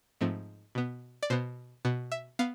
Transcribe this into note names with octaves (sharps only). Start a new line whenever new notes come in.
G#2 F3 A3 C4
B2 B3
D5
B2 B3 C5
B2 B3
E5
B3 F5